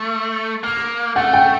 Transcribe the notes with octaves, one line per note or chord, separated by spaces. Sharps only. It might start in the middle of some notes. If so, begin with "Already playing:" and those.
Already playing: A3
A#3
A3 F#5
G5